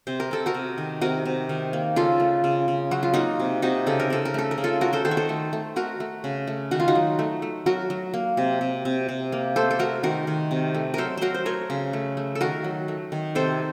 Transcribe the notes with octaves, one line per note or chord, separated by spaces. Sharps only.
C3 C5
A#4
C3 A4
F#4 A#4
C3
D#3
C3 F#4 A#4
C3
D#3
A#3
C#3 F4 A4
A3
C#3
C#3
F#3 F#4
F4
A#3 D#4 F#4
C3
C3 D#4 F#4
C#3 A4
A#4
C#3 A4
A#4
A3 A4
A#4
C#3
F4 A4
A3 F#4 A#4
A4 C5
D#3 A4 C5
C#5
A4 C5
A3
A3
A3 F#4 A#4
A3
C#3
A3
D#3 F#4
F4
D#4 F#4
F#3
A3
A3
F#3 F#4 A#4
F#3
A#3
C3
C3
C3
C3
A#3
A3 A4 C5
A4
A3 F#4 A#4
D#3 F#4 A#4
D#3
C3
A3
F#3 A4 A#4 C5
F#3 F#4 A#4 C5
C5
A3 A#4 C#5
C#3
A3
A3
A4
D#3 F#4 A#4
F#3
A3
D#3
C3 A4 C5